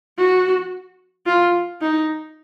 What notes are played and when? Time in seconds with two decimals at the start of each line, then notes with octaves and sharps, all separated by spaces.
0.18 F#4
1.26 F4
1.81 D#4